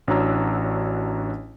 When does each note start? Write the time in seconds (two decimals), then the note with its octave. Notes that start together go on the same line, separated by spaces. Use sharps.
0.07 A1 D4 F#4 C#5 A#5 E6